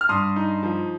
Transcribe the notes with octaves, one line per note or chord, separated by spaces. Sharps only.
F6
G2 C6 D#6
D#4
F3